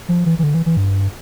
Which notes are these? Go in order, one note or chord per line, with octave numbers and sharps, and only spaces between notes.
F3
E3
E3
D3
E3
E3
G2